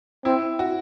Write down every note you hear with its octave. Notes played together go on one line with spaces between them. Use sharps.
C4 E4
F#4